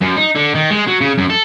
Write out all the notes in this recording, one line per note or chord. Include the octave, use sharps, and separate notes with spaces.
F#2
D#4
D3
D#3
G#3
F#3
C#3
F#2
A4